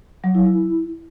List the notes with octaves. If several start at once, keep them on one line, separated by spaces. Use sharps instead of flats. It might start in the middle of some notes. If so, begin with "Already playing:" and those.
F#3
E4
E4